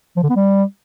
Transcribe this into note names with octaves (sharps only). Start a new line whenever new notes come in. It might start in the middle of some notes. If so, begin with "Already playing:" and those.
F3
D3
B3
G3